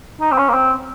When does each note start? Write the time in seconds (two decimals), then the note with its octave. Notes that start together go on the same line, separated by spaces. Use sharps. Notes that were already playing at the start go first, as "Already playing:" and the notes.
0.21 D#4
0.32 C4
0.38 C#4
0.49 A#3
0.54 C4